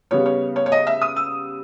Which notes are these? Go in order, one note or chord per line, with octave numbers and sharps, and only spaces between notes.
C#3 G3 B3 C#5
C#5
C#5
C#5
D#5
E5
D#6
E6